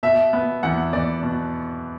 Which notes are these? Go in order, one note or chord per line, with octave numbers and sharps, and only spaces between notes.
B2 E5
B3
E2 F#5
E2 D5
B2